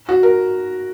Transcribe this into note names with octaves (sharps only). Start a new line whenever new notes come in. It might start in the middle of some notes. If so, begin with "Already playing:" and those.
F#4
A#4